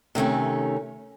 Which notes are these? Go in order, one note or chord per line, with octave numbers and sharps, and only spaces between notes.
C3 D#3 A3 C#4